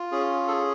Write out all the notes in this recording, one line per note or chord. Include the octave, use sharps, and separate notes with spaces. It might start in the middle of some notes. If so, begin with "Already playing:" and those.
Already playing: F4
C#4 G#4
G#4 A4